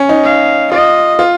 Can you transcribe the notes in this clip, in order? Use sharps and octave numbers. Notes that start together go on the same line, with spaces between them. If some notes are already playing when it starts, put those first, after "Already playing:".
Already playing: C#4
D#4
F5
F4 D#5
F4